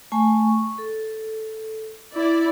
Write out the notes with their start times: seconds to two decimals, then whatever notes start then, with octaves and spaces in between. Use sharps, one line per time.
0.12 A3 G#5 C#6
0.47 C#6
0.78 A4
2.14 E4 D5